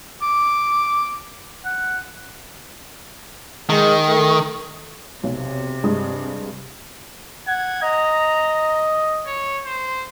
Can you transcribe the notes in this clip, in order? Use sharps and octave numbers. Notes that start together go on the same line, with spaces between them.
D6
F#5
D#3 G#3
A3
B1 C3
G2 G#3 D#6
F#5 G#6
D#5 A#5
C#5
C5